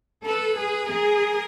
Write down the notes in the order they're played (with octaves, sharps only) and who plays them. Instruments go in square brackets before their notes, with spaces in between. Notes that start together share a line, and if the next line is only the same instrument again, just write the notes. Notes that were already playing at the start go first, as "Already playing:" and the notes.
[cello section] A4 [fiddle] B4
[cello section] G#4
[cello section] G#4 [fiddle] A#4